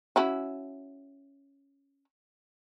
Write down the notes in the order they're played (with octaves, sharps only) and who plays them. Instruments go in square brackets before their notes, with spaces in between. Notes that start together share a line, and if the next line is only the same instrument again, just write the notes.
[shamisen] C#4 E4 F#4